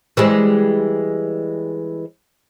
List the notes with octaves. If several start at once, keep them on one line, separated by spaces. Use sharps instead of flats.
E3 G3 G#3